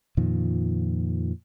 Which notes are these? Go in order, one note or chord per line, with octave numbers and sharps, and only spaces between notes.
F2 A#2 D#3 F3